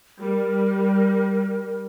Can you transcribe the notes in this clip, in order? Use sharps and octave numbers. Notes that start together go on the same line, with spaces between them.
G3 A#4